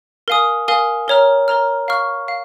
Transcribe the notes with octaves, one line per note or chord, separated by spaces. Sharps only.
A#4 F5 G#5 D#6
A#4 F5 G#5 D#6
A#4 C#5 A#5 F6
A#4 C#5 A#5 F6
F5 C#6 F6
F5